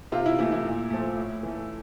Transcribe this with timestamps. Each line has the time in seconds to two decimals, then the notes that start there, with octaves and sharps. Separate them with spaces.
0.12 C3 F4
0.26 E4
0.39 E3 A3 E4
0.52 E4
0.65 A#2
0.90 F3 A3
1.17 A2
1.43 E3 A3